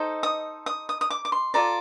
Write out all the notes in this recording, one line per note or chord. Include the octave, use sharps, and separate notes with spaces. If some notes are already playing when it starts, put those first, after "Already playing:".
Already playing: D#4 A4 C5 D#5
D#6
D#6
D#6
D#6
D6
D6
C6
F4 A4 D5 A#5